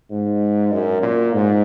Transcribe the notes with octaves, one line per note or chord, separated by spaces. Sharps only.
G#2
F#2
A#2
G#2